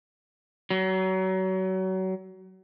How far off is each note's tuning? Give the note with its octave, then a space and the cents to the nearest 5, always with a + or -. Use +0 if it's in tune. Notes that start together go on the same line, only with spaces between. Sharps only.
F#3 +30